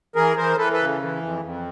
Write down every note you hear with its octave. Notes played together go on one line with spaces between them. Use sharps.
E3 G#4 A#4
E3 A#4 C5
E3 A4 B4
A4 B4
C#3
E3
F2
F2